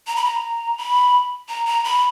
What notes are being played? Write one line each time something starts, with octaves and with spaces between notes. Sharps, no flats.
A#5
B5
A#5
B5
A#5
A#5
B5